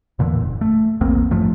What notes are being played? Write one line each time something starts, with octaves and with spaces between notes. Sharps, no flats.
E2 A#2 D3 E3
F#1
A3
A#1 E2 A#3 C4
A1 G2 F3 A3